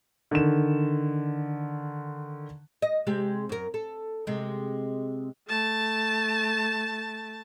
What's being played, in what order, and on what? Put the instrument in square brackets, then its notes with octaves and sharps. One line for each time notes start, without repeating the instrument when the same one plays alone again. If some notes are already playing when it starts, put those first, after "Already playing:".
[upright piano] D3 D#3 E7
[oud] D#5
C3 G#3 G4
F#2 A#4
A4
C3 G#3
[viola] A3 A5